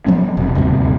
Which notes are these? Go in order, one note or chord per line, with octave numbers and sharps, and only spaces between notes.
F3 F#3 B3 C#4
F1 B2
D#1 D2 G2 C3